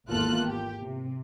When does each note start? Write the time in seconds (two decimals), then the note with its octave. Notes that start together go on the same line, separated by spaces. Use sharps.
0.10 G#1 E2 A#3 F4 A4 F#6
0.47 G4
0.83 C3